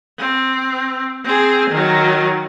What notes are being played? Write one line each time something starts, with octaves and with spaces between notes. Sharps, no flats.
C4
C4 G#4
D#3 F#3